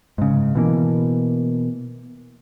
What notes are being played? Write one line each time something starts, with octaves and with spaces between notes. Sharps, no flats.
G#2 C#3
B2 E3 A#3